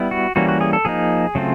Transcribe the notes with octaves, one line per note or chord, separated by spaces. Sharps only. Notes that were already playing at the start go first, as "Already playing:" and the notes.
Already playing: G3 B3 E4
F#4
E3 G3 A#3 C#4 F#4
F#4
G#4
A4
F3 A#3 D#4 G#4
C#3 F#3 A3 C4 F4